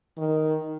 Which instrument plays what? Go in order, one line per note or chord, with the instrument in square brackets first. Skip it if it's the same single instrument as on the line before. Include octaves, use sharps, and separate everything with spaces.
[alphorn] D#3